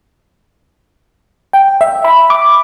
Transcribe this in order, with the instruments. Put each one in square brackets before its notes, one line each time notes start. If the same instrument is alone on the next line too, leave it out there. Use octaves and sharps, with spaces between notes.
[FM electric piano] G5
E5
B5
D6